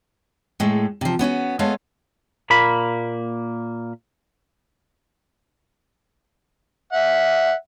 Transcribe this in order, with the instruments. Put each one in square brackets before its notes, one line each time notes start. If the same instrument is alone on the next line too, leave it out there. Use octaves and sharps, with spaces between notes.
[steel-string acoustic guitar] A2 G#3 A3
C3 F3
B3 C#4 D#4 F#4
G#3 A3 B3 A4 C#5 F5
[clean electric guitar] A#2 A#3 B5
[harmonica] E5 F#5